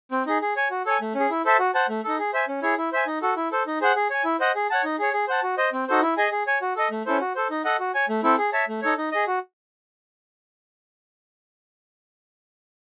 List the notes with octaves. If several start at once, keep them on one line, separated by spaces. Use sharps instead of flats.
C4
D#4 G#4
G#4
C#5 G#5
F#4
A4 C#5 G#5
A3
C#4
G#4
E4
A4 C5 E5 A5
F#4
C5 F#5 A5
A3
D#4 A4
G#4
C5 E5 G#5
C#4
E4 G#4 C#5
E4
C5 E5 G#5
D#4
F#4 A4
E4
A4 C5
D#4
G#4 C5 F#5
G#4
C#5 G#5
E4
C5 D#5 F#5
G#4
C#5 F#5 A5
D#4
G#4 C#5
G#4
C5 F#5 A5
F#4
C5 D#5
C4
D#4 F#4 A4 C5
E4
G#4 D#5 G#5
G#4
C#5 G#5
F#4
A4 D#5
A3
C#4 E4 A4 C5
F#4
A4 C5
D#4
A4 D#5 F#5
F#4
C#5 G#5
A3
C4 E4 A4
G#4
C#5 E5 A5
A3
D#4 A4 C#5
D#4
G#4 D#5
F#4